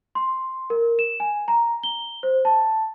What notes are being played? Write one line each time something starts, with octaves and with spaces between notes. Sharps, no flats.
C6
A#4
E7
G#5
A#5
G7
C5
A5